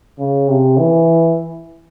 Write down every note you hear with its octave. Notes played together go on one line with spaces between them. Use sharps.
C#3
C3
E3